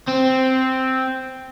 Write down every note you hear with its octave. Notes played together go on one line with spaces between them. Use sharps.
C4